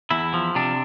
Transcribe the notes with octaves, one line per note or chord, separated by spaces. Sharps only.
E2 E4
F3
C3 D4